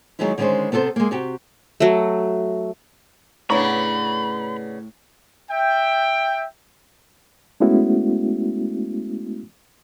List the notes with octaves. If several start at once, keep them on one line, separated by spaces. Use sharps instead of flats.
D#3 F#3 G#3 B3 D#4 E4
D3 D#3 G#3 C#4 B4 C5
C3 B3 A4 B4 C5
G#3 A#3
C3 F#4 G4
F#3 A3
A2 C#3 B3 D4 C#5 A#5 B5
E5 G5
G#3 A3 B3 C#4 E4 F#4